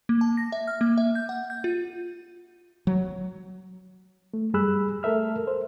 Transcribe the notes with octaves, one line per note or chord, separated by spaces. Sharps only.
A#3
A5
A#6
E5
F6
A#3
E5
G6
F#5
G6
F4
F#3
A3
F#2 G3 G#4 B5 E6 F#6
A3 A4 A#4 E5 F6
C5